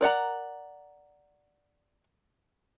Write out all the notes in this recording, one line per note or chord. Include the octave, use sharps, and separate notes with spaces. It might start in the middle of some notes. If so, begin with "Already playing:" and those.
A#4 D5 F#5 A#5